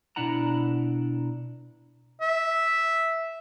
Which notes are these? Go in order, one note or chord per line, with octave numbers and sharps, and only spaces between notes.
B2 D4 E4 F#5 A#5
E5